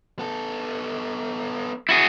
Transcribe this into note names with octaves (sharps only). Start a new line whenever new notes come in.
B3 A4
E4 F#4 G#4